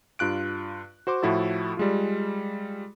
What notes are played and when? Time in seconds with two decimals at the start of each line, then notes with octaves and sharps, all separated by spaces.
0.19 G2 F4 F#6 D7
1.07 F#4 C5 C6 D6
1.22 A2 F3 E4 F#4 A4
1.77 G3 G#3 F4